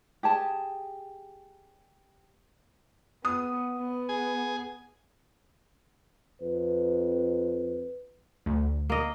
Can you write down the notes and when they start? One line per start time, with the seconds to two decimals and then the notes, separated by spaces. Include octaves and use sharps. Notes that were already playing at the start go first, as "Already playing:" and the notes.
0.23 G4 G#4 A5
3.25 B3 D#6
3.77 B3
4.09 G#4 G#5
6.42 F2 B4
8.46 D2
8.90 A#3 D#5